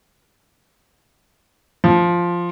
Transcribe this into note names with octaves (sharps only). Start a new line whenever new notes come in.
F3